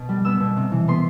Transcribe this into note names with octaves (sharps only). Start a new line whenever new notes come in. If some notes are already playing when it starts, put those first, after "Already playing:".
Already playing: B2
G3
B3 E6
B2
C3
E3
B3 C6